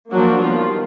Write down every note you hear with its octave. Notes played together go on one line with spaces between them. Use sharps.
F3 F#3 A#3 D4 F#4
D#3 F3 G3 B3 F4